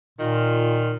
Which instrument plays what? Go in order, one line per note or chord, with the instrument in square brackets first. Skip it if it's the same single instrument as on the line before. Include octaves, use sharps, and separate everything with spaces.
[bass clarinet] A#2 [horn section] D#3 F4